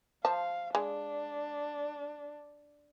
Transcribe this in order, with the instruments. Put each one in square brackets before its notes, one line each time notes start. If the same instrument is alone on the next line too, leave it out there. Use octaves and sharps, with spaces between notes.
[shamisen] F3 A5 [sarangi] F5
[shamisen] G#3 [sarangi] D4